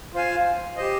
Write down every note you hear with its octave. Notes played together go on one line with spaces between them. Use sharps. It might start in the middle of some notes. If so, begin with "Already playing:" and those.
F4 C5 F5 G#5
G4 C5 D#5